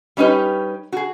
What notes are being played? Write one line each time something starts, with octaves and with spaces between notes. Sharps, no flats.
G3 C#4 D#4 G4 B4
F#4 G#4